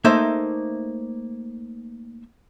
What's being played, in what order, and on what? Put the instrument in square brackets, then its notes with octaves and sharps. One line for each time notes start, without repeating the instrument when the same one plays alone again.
[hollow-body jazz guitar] A3 A#3 D#4 A4 C5 E5